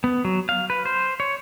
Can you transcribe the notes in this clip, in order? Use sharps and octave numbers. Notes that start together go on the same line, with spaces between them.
B3
F#3
F5
B4
C5
C#5